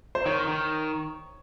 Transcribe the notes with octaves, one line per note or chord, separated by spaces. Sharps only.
C5
D#3 C#5
D#3